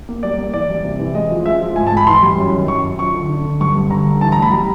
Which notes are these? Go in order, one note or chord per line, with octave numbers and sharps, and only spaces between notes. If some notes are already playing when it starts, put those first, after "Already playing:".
A#3
G3 D5
A#3
E3 D5
G3
C3
E3
G#3 D#5
F3
G#3 E5
F3
G#2 G#5
A5
G#2
B5
E3 C6
G3
F#2
D#3
F#2 C#6
F#2
F3 C#6
D3
D4
D3
G2 C#6
G2
D3 A#5
G2
E3 A5
A#5
A2
B5
G3 A#5